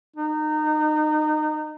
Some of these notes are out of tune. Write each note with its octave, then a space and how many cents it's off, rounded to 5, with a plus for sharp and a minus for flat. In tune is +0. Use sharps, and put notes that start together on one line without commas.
D#4 -25